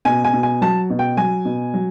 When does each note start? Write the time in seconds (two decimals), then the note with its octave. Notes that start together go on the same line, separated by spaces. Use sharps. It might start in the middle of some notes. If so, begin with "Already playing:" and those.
0.05 B2 G#5
0.24 G#5
0.33 B2
0.43 G#5
0.61 F#3 A5
0.90 B2
0.99 G5
1.17 F#3 G#5
1.45 B2
1.74 F#3